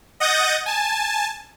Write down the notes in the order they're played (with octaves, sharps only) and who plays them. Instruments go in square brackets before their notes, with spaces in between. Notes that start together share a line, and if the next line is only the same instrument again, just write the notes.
[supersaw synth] D#5 F#5 D#6 G6 A6 A#6
G#5 A5